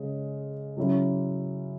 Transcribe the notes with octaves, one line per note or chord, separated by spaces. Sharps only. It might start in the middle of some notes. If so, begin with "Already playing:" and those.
Already playing: C#3 G#3
C#3 F#3 C#4 E4